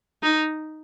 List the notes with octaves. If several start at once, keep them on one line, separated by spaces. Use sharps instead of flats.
D#4